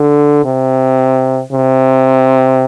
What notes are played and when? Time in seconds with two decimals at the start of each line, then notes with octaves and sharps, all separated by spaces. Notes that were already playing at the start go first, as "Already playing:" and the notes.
Already playing: D3
0.45 C3
1.53 C3